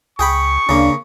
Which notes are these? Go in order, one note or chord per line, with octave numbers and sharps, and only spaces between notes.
C#2 G#4 G5 B5 C#6
D2 C#3 A#3 D4